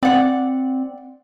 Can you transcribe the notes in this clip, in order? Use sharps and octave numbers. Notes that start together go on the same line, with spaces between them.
C4 D5 F#5